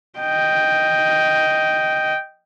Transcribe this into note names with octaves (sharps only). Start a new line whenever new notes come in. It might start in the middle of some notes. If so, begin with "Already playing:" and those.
D#5 G5